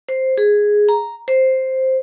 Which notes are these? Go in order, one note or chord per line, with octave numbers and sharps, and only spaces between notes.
C5
G#4
A#5
C5